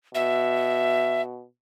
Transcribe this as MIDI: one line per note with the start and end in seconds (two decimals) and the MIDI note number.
0.15 1.44 47
0.15 1.22 76